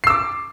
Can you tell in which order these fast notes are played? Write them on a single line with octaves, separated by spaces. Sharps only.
C7 E6 D6